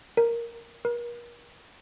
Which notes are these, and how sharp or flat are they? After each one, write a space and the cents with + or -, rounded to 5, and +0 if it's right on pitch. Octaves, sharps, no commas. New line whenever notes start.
A#4 +0
A#4 +40